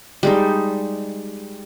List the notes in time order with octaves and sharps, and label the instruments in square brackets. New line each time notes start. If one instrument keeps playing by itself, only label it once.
[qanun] G3 G#3 D#4